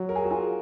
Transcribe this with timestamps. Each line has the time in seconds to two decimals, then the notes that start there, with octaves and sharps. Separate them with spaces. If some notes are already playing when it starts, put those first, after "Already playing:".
Already playing: F#3
0.09 A#4
0.16 G#4
0.24 F#4
0.31 F4 G#4